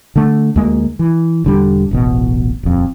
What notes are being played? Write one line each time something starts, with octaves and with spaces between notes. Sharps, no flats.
D3 A3
D2 G#3 A#3
E3
E1 D3 G3
D1 A1 B2
D#1 F2